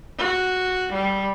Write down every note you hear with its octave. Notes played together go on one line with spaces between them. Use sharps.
F#4
G3